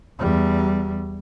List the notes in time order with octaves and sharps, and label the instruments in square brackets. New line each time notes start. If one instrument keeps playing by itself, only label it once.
[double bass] E2 G3